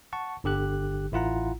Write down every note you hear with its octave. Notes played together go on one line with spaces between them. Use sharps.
F#5 A5 C#6
G1 D3 G4 F#6
A1 E4 F4 F#5 A#5